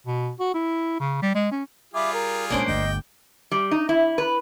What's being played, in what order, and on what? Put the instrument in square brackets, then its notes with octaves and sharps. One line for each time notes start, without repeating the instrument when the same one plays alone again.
[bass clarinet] B2
F#4
E4
C#3
G3
G#3
C#4
[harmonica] G3 F4 G#4 [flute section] E5 B5 D6
[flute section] A#4
[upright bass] A#2 G#3 [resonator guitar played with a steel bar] A#3 D4 C5 [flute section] C#4 G#5
[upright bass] G1 D2 [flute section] D#5 [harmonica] G5 D6
[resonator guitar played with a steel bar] G3
D#4
E4
B4